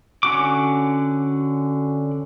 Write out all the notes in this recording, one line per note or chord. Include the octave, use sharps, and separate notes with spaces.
D3 C#4 F#4 D6